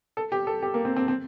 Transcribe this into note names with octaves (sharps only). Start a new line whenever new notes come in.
A4
G4
A4
G4
A#3
C4
C4
C4